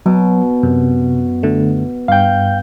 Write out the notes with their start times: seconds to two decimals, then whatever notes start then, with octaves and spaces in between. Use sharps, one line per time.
0.06 B2 F#3
0.63 F#2 C3
1.43 D3 A3
2.08 G2 F5 G5 G6